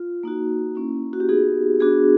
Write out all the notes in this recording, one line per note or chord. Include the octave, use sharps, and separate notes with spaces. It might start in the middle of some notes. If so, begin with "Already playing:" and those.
Already playing: F4
A#3 D#4 F#4
A#3 C#4 E4
F#4
G4
B3 D#4 F#4 G#4
B3 D4 F#4 G#4